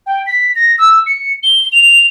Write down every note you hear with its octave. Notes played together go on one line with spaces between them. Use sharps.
G5
B6
A#6
E6
C#7
G7
F7